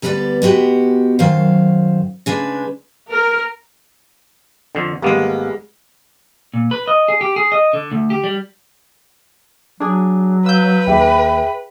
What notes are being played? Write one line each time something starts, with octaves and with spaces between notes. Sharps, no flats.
D2 G3 B3 A#4 B4 D5
G#3 B3 F#4 G4
F#2 D#3 F#3 C5 F5
C#3 G#3 D4 B4
A#4
F2 D3
G#1 G3 G#3 A#3 B3
A#2
B4
D#5
G#4
G4
G#4
D#5
D3
D2
G4
G3
F#3 D4 G#4
B4 F5 E6 G6
D#2 G#4 E5 G5